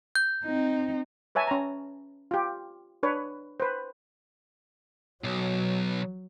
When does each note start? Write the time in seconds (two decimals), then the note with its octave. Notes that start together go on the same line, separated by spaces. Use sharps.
0.15 G6
0.45 C4 D#4
1.35 B4 C#5 E5 G#5 A5
1.47 C#4 A#5
2.31 F4 G4
3.03 D4 B4 C#5
3.60 B4 C5
5.24 B1 F#3